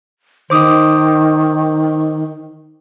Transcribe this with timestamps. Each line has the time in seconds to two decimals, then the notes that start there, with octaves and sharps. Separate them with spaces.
0.50 D#3 C5 D6 D#6